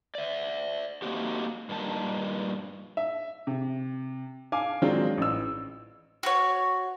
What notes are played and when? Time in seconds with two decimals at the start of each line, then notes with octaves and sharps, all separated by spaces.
0.15 D5 E5
1.02 A3 A#3 C4 D#4 F#4 G4
1.69 G2 A#2 D#3 A5
2.97 E5
3.47 C3
4.52 F5 G#5 D6
4.82 D#3 F#3 G#3 C4 D4 F4
5.18 A1 E6
6.23 F#4 C#5